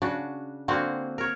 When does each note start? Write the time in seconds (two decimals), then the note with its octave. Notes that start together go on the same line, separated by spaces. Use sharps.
0.02 C#3 D4 F#4
0.68 D3 A#3 C4 F#4
1.18 A#4 C#5